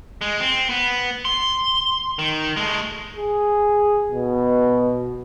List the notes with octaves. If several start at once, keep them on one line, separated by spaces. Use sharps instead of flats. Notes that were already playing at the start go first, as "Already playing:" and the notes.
G#3
C4
B3
C6
D#3
G#3 A3
G#4
B2